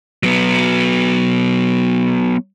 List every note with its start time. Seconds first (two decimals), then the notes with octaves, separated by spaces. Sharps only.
0.23 F#3 B3